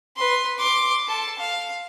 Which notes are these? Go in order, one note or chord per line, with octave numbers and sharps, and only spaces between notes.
B4 C6
C6 D6
A4 A5
F5